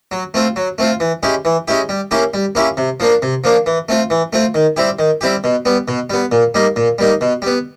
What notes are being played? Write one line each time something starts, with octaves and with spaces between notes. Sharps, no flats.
F#3
A3 C4 F4
F#3
A3 C4 F4
E3
G#3 C#4 E4 G4
E3
G#3 C#4 E4 G4
G3
A#3 C#4 E4 G4
G3
A#3 C#4 E4 G4
C3
F3 A#3 D4
C3
F3 A#3 D4
E3
A3 C4 F4
E3
A3 C4 F4
D#3
G3 C4 E4 G4
D#3
G3 C4 E4 G4
B2
G3 B3
B2
G3 B3
A#2
G3 A#3 D#4
A#2
G3 A#3 D#4
B2
G3 B3